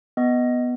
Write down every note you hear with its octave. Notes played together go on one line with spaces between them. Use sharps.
B3 D#5